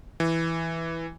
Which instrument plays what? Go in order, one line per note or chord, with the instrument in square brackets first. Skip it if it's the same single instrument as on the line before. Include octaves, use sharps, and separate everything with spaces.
[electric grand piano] E3